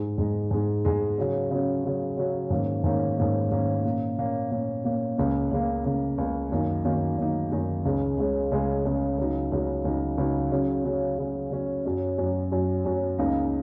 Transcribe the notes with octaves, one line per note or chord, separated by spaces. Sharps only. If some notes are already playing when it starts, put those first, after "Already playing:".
Already playing: G#2 G#3 D#4
G#2 G#3 D#4
G#2 G#3 D#4
G#2 G#3 D#4
C#3 F#3 C#4
C#3 F#3 C#4
C#3 F#3 C#4
C#3 F#3 C#4
G#2 D#3 A#3 C#4
G#2 D#3 A#3 C#4
G#2 D#3 A#3 C#4
G#2 D#3 A#3 C#4
A#2 A#3 C#4
A#2 A#3 C#4
A#2 A#3 C#4
A#2 A#3 C#4
C#2 C#3 A#3
C#2 C#3 A#3
C#2 C#3 A#3
C#2 C#3 A#3
F#2 D#3 A#3 D#4
F#2 D#3 A#3 D#4
F#2 D#3 A#3 D#4
F#2 D#3 A#3 D#4
C#2 C#3 G#3 C#4
C#2 C#3 G#3 C#4
C#2 C#3 G#3 C#4
C#2 C#3 G#3 C#4
C#2 C#3 F#3 D#4
C#2 C#3 F#3 D#4
C#2 C#3 F#3 D#4
C#2 C#3 F#3 D#4
C#3 F#3 C#4
C#3 F#3 C#4
C#3 F#3 C#4
C#3 F#3 C#4
F#2 F#3 C#4
F#2 F#3 C#4
F#2 F#3 C#4
F#2 F#3 C#4
C#2 C#3 A#3 D#4